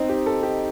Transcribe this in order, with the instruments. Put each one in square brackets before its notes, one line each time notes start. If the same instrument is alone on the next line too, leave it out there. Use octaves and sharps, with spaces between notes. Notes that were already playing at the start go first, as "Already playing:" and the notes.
Already playing: [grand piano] C4 [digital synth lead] D#4
[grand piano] G4
A4
G4